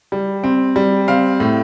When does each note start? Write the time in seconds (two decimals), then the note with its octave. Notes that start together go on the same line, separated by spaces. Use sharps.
0.12 G3
0.44 C4
0.76 G3
1.08 C4 F5
1.40 A2